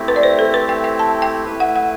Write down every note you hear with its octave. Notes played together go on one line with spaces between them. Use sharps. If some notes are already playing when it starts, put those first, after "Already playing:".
Already playing: A3 C4 E4 G4
B4
D5
C5
A4
B4
G5
G5
A5
G5
A3 E4 B4
F#5
F#5